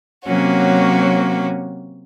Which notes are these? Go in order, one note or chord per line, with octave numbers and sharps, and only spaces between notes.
C3 F#3 A#3 C#4 F#4